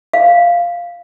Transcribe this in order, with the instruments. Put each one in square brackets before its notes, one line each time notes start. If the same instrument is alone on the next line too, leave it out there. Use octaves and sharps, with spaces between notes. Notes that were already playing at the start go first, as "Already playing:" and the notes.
[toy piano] F5